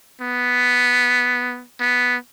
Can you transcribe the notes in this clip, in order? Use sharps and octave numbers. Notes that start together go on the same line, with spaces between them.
B3
B3